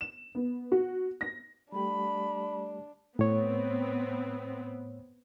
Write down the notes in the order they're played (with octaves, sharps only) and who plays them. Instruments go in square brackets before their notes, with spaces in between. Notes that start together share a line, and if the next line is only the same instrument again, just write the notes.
[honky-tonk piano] E7
B3
F#4
A#6
[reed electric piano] G3 A3 G4 [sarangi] D4 [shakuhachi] B5
[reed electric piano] A2 C#5 [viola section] B3 C4